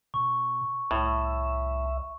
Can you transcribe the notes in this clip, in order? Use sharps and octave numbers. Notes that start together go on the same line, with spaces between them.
B2 C#6
C2 A2 E5